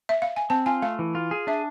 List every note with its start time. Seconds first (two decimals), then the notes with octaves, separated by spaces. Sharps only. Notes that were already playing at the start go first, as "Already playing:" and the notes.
0.09 E5
0.22 F5
0.36 G#5
0.50 C4 A5
0.66 F4 G#5
0.82 A3 F5
0.99 E3
1.15 F4
1.31 G#4
1.47 D4 E5